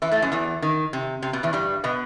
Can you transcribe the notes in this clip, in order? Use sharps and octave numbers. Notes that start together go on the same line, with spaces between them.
E3 E4
A2 A3
F#2 F#3
E2 E3
D#3
C3
C3
B2
E2 E3
G2 G3
B2 B3